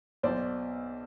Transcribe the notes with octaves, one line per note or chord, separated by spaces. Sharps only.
B1 B2 C5 D5